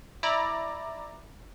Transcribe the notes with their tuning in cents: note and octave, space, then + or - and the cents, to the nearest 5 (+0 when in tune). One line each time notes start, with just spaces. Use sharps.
E4 -10 D5 +10 A#5 +0